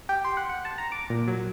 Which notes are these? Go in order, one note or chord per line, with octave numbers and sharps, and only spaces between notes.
G4
C6
F#5
F#5
A5
A#5
D6
A#2
F#3